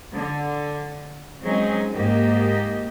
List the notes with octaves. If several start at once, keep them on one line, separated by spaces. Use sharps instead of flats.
D3
F#3 G#3 C4 C#4 D#4 G#4
G#2 A#3 G4 D#5